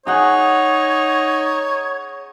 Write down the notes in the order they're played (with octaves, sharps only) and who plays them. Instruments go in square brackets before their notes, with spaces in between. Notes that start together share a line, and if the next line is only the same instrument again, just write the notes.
[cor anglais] D#4 [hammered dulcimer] G#4 F#5 [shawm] C#5